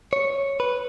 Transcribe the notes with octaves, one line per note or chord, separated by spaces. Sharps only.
C#5
B4